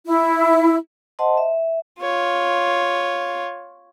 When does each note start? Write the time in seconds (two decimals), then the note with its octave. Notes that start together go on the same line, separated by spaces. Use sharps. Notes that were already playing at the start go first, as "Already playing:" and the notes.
0.06 E4
1.19 C5 D#5 F#5 A5 C6
1.37 E5
2.01 F4 C#5